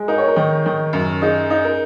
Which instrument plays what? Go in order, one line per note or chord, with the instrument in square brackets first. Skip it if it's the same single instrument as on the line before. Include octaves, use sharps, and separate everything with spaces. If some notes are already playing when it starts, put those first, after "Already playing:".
Already playing: [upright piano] G#3 [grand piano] G#4
[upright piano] D#4 [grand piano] A#4
[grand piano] C#5
A#4
[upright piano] D#3
D#3
F#2
[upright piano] D#4 [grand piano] G#4
[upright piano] D#4
[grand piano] A#4